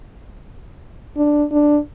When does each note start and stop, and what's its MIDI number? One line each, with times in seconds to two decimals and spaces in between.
1.17 1.44 62
1.51 1.78 62